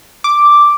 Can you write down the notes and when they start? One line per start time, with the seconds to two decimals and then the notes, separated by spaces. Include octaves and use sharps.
0.24 D6